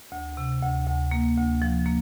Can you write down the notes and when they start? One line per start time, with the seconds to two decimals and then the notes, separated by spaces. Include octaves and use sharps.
0.12 D2
0.37 C3
0.62 D2
0.86 D2
1.11 A#3
1.37 D2
1.62 F3
1.86 A#3